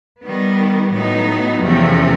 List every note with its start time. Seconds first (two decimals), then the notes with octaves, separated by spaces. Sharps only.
0.22 D#3 G3 B3
0.92 A2 F#3 B3 D#4
1.61 E2 C3 F3 A3 C#4